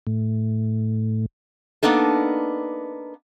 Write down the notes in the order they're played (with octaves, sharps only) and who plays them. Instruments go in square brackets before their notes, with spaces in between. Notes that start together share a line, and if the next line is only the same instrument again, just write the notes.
[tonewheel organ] A2
[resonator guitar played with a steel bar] A#3 B3 D4 D#4 A4